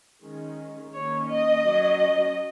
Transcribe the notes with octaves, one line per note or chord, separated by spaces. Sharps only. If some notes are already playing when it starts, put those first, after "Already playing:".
D#3 G#3 C#4
D#3 A#3 C#4 C#5
D#5
F#3 C#4